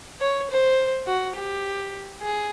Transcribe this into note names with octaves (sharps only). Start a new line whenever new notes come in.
C#5
C5
F#4
G4
G#4